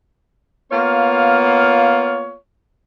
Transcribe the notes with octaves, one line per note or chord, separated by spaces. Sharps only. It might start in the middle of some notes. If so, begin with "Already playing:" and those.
A#3 B3 F4 C#5 F5